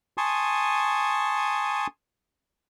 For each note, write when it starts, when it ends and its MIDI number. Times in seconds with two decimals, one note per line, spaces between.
0.18 1.87 80
0.18 1.87 81
0.18 1.87 84
0.18 1.87 85
0.18 1.87 87